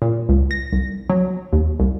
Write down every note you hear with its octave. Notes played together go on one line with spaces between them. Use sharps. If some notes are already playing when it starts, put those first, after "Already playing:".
A#2
C#2
A#6
C2
F#3
D#2
C2